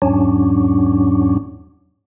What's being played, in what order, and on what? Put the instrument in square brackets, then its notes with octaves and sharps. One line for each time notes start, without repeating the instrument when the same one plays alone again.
[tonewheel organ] E2 G#2 F#3 C#4 D4